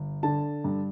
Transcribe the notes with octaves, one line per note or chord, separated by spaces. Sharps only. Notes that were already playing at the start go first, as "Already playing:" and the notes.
Already playing: G1
D3 A5
G2